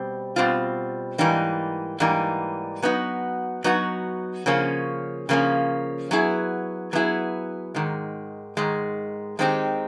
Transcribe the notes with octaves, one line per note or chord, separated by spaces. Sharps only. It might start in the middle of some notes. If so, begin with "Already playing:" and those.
Already playing: B2 G3 C4
B2 G3 C4 F4
G#2 E3 G3 A#3 D#4
G#2 E3 G3 A#3 D#4
F#3 B3 D#4 F#4
F#3 B3 D#4 F#4
C#3 F3 A#3 C#4
C#3 F3 A#3 C#4
F#3 B3 E4 G#4
F#3 B3 E4 G#4
G#2 D#3 G#3
G#2 D#3 G#3
D#3 G#3 C4 D#4 G4